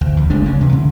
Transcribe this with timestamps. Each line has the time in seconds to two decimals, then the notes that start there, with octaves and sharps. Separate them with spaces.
0.01 D2
0.17 E2
0.30 F#1 G#3 A3 D4
0.45 C#2 C#4
0.61 C3 E3
0.73 D3